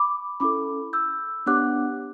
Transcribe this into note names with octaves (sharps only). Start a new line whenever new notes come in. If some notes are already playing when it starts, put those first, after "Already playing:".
Already playing: B5 D6
C#4 E4 A4 B5 D6
E6 G6
B3 D4 G4 C#5 F#5 D6 F#6